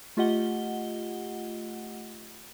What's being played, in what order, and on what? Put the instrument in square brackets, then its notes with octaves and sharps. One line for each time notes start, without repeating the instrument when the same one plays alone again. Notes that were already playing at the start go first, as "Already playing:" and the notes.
[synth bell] A3 F4 G4 D#5 F#5 G7